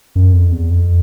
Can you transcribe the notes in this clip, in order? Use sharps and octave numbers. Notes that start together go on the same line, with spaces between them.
F#2
F2
E2
F2